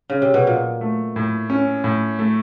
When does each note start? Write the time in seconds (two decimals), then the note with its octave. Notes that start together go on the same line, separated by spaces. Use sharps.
0.10 C#3
0.22 C3
0.34 B2
0.47 A#2 F#3
0.81 A3
1.16 A2
1.50 C#4
1.84 A2
2.19 A3